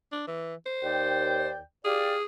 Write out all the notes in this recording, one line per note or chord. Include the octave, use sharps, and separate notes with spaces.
D4
E3
C5
D#2 D5 G5
G4 G#4 D5 F5